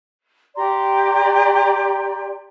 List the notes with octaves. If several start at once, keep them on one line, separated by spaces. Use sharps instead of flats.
G4 D5 A#5 C6